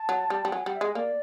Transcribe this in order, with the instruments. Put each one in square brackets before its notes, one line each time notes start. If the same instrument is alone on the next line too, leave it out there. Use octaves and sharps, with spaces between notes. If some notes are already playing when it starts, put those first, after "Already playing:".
Already playing: [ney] A5
[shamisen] F#3
G3
G3
[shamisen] F#3 [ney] G#5
[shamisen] G3 [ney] F#5
[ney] E5
[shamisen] G#3 [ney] D#5
[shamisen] A#3 [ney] D5